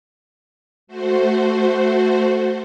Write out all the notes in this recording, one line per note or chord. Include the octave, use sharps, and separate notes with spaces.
A3 F#4 C5